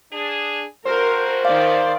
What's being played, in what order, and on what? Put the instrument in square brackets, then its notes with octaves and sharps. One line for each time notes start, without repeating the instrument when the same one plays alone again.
[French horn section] D4 G#4
[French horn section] G2 F#4 [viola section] A#4 [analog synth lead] C5
[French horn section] D#2 A#2 F3 [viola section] D#3 D5 [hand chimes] F5